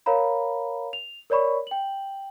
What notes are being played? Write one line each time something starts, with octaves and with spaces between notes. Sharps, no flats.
A#4 C#5 F5 A#5 B5
F7
A#4 C#5 D5 B5 C#6
G5 F#7